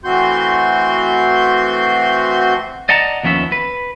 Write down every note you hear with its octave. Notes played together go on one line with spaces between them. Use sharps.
E3 A3 C4 F#4 C6 G6
D5 D#5 F#5 A5 A#5
D#2 F3 B3 C#4 E5
B4